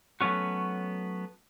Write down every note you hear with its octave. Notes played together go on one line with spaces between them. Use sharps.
F#3 A3 B3 C#4 F#4